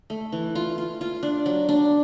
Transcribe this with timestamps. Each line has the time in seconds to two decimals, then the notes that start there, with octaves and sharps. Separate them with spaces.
0.10 A3
0.32 E3
0.55 F4
0.78 F4
1.01 F4
1.23 D4
1.46 F#3
1.69 D4